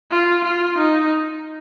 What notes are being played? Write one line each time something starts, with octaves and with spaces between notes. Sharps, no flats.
F4
F4
D#4